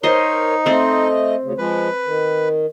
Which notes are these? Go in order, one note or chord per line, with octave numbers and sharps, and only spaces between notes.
D#4 A#4 C5 C#5 D#5 C6
A3 C4 C5 D#5
D2 C#3
F3 G#3 B4
D#3